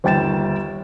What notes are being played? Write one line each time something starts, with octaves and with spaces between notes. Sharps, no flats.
G1 D#2 G5 A6 E7